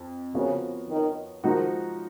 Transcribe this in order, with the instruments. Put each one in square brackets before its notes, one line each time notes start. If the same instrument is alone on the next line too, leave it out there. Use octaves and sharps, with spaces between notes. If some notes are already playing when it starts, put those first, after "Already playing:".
Already playing: [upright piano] F2
[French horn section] C#3 [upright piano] F3 B3 F#4 A#4 C#5
[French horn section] D#3
[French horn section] D#3 [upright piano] F3 G#3 D#4 F#4